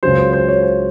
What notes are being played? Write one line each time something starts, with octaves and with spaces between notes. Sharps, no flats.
C#2 C#3 F#3 C5
C5
C5
C#5
C5